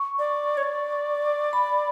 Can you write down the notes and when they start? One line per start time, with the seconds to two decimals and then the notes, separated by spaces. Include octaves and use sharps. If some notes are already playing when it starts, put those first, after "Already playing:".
Already playing: C#6
0.19 D5
0.57 C#5
0.63 D5
1.53 B5